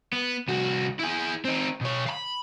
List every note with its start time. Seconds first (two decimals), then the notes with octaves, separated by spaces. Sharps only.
0.13 B3
0.48 C2 F#4
0.99 E4 G#4
1.45 C4 D#4
1.81 B2 C#5
2.06 F5 B5